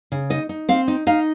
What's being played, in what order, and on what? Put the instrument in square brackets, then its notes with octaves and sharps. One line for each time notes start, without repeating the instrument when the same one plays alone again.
[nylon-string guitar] C#3
D#4 D#5
D#4
C4 F5
D#4
D#4 F5